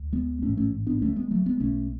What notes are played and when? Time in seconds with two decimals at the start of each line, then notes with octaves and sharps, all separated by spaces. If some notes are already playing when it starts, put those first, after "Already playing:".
Already playing: D2
0.13 G#3 B3
0.42 A1 G#2 A3 C#4
0.57 A3 C#4
0.87 B3 D4
1.02 D2 D3 A3 C#4
1.16 G#3 B3
1.31 F#3 A3
1.46 G#3 B3
1.60 B1 B2 A3 C#4